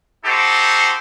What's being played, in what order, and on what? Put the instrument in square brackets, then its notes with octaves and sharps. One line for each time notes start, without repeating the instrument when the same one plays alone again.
[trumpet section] D#4 F#4 G4 A4 C5